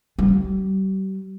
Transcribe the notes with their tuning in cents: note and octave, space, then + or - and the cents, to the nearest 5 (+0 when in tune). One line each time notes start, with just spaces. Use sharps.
G3 -40